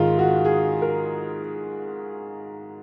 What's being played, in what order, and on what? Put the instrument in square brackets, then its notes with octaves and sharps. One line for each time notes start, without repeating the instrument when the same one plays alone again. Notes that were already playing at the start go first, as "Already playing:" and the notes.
Already playing: [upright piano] G#2 D#3 F4
F#4
G#4
A#4